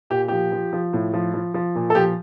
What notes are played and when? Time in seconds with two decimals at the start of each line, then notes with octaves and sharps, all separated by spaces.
0.10 A#2 G4
0.28 F3 G4
0.52 F3
0.73 F3
0.93 A2
1.14 F3
1.34 F3
1.54 F3
1.75 A#2
1.90 A4
1.95 F3 G4